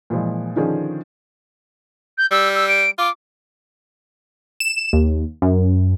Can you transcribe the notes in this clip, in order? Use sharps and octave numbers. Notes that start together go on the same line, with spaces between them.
A#2 E3 F3 G#3
D3 D#3 F3 C#4 D4 G#4
G6
G3 E6
E6
D7
F4 D6
E7
D#2
F#2